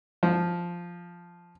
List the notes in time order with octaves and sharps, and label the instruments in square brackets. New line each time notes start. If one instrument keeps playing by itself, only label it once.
[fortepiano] F3